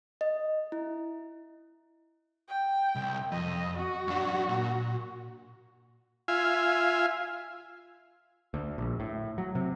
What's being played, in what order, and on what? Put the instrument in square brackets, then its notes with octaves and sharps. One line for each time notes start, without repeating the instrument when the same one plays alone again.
[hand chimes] D#5
E4
[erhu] G5
[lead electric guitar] C2
[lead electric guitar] F2 [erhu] D#5
[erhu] F#4
[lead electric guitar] F#2 D4
A#2
[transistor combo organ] F4 E5 F5 G#5
[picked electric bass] D2
A#1
A2
F#3
C3